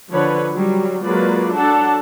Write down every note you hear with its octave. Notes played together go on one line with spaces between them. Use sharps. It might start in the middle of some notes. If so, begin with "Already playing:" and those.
D3 F3 B4 C#5
F#3 G3
F#3 G#3 A#3 F4 B4 D5
F#3 D4 A4 F#5 A5